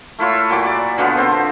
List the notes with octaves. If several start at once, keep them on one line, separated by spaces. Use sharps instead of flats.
A3 E4 F4 C#5
A#2 F#3 D6
D5
B2 D3 F3 B3
D3 C4 C5